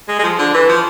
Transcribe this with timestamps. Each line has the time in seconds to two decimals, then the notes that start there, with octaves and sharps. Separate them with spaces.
0.08 G#3
0.19 G#3
0.23 F3
0.39 D3
0.54 E3
0.69 F3